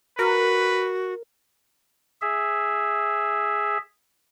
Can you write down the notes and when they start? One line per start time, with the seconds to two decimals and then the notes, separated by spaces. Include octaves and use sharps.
0.19 F#4 A#4 B4
2.22 G#4 E5